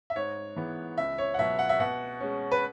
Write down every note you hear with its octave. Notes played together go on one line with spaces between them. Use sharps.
E5
G#2 C#5
E3 G#3 B3
C#2 E5
C#5
F#5
B2 F#3 E5
F#5
E5
B2 F#5
G#3 C#4
B4